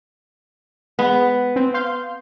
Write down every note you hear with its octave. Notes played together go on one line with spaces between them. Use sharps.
G#3 B3
C4
F5 C6 G6